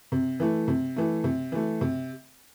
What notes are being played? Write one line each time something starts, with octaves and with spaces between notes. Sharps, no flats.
C3
E3 A3
C3
E3 A3
C3
E3 A3
C3